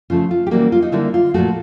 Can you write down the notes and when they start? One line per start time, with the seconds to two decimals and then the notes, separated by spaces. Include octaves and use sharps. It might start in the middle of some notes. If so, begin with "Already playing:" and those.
0.10 C#3 F3 A3 F4
0.31 F4
0.47 G4
0.51 C#3 E3 G3 A#3 F#4
0.72 F4
0.82 D#4
0.92 D3 G3 A#3 E4
1.14 F4
1.34 A#2 F3 A3 F#4